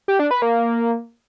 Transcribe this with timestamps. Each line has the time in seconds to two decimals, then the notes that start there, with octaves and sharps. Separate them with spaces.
0.08 G4
0.19 D4
0.31 B4
0.42 A#3